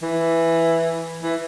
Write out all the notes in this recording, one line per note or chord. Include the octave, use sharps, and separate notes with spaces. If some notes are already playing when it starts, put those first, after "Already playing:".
E3
E3